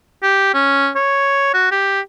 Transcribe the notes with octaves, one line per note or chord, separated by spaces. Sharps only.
G4
C#4
C#5
F#4
G4